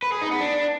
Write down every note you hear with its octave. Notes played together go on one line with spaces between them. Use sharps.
B4
G#4
D#4
B3
D4